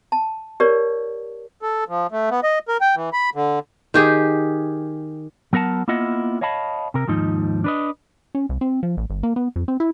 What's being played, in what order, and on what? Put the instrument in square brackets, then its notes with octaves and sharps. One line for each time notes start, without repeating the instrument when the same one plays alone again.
[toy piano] A5
G4 A#4 C#5 D5
[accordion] A4
F3
A3
B3
D#5
A#4
G5
E3
B5
D3
[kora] D#3 G4 G#4
[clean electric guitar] F#3 B3 A#4 F#5 A5
A#3 B3 E4 F4 D#5 F#5
C#5 D#5 F5 A5 B5
C3 A#4
D#2 G#2 F3 D#4
D4 B4 D#5
[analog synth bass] C#4
C2
C4
F3
A1
G1
A#3
B3
F2
C4
E4